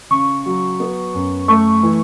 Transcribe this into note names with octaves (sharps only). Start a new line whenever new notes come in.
C#3 C#6
F#3
B3
F#2
A3 C#6
E3